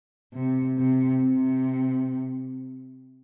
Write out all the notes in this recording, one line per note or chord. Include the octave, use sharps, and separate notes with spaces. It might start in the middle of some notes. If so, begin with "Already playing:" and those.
C3
C3
C3